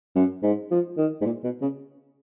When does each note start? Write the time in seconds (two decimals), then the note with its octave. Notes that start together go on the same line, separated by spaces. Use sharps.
0.16 F#2
0.43 G#2
0.71 F3
0.98 D#3
1.21 G#2
1.25 A#2
1.44 B2
1.62 C#3